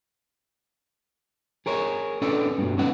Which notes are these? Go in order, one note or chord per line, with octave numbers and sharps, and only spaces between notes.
G#4 A#4 C#5
C#4 D4 A4 B4 D5
G2 B2
C#4 D#4 B4 F#5